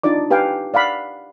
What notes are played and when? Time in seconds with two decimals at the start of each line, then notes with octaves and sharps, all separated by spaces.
0.03 D4 D#4 F4 D5 D6
0.30 G4 B4 F5 G5 G#5
0.74 D5 F5 F#5 B5